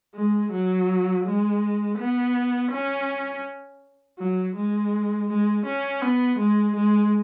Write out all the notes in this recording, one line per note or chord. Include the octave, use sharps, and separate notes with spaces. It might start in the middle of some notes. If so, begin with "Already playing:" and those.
G#3
F#3
G#3
B3
C#4
F#3
G#3
G#3
C#4
B3
G#3
G#3